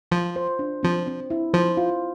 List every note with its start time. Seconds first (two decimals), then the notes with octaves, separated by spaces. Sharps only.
0.11 F3 F4
0.36 C5
0.59 D4
0.83 F3 C4
1.07 C4
1.30 E4
1.54 F3 C5
1.77 F4